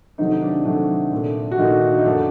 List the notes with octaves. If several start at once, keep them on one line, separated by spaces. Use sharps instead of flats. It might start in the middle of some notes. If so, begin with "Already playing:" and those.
C3 D#3 F#3 A3 D#4
D#4
D4
C3 F#3 A3 D4
A#2 A3
F#4
A#2 D#3 A3 D#4
D#4
F#2 D3 F#3 A3 D4